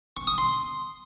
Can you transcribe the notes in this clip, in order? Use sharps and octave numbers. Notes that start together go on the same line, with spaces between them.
C#6
D#6
C6